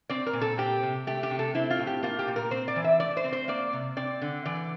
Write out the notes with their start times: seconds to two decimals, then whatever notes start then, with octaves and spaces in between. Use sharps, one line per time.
0.09 C4 D5
0.26 A#4
0.33 A#2
0.41 A4
0.58 C4 G4
0.83 C3
1.07 A3 G4
1.23 G4
1.31 C3
1.39 A4
1.55 C4 E4
1.70 F4
1.79 A2
1.87 G4
2.03 A#3 F4
2.19 G4
2.28 A#2
2.36 A#4
2.51 C4 C5
2.68 D5
2.76 E3
2.84 E5
3.00 A3 D5
3.17 C5
3.24 C4
3.32 C5
3.48 A#3 D5
3.73 C3
3.97 C4 D5
4.22 D3
4.46 E3 D5